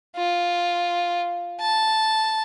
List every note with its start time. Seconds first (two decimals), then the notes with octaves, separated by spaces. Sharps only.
0.16 F4
1.61 A5